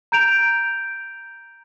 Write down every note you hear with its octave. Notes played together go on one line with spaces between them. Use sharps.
A#5 G6 D7 F7